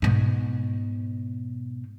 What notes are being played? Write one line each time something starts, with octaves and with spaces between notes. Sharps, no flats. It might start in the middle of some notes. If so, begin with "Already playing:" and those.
G#2 B2